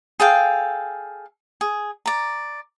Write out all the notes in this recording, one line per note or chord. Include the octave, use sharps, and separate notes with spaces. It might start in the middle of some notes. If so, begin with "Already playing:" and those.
G#4 A4 F5 G5
G#4
D5 A#5